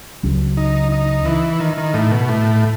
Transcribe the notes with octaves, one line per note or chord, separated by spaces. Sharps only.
C#2 C#3 F#3
D#4
D#4
E3
D#3
D#3
A2
B2
A2